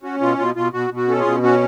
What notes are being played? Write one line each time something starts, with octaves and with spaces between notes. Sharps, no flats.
C#4 F#4
B2 F4
B2 F4
B2 F4
B2 F#4
B2
F#4
C#4 A4
F4 G#4
B2
C#4 F#4